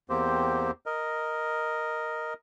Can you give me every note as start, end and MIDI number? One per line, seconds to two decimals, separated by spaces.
0.10 0.71 40
0.10 0.71 58
0.10 0.71 60
0.10 0.71 67
0.10 0.71 72
0.86 2.34 70
0.86 2.34 75